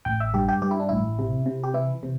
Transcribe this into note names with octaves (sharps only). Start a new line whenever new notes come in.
A1 G5
E5
G2 G4
G4
G2 G4
E4
D4
A1 E4
C3
C3
G4
E3 E4
C3